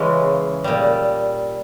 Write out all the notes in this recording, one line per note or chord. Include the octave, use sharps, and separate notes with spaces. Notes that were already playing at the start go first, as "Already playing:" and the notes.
Already playing: C#3 E3 G#3 C#4
A#2 G3